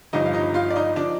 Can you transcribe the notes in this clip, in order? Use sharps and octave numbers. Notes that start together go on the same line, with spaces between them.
G1 G2 F3 D#4 D#5
F5
D#4 D#5
F4 F5
D5
D#4 D#5
F3 D4 D5